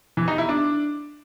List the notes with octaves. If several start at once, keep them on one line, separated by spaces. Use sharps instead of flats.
E3
D#4
E4
D4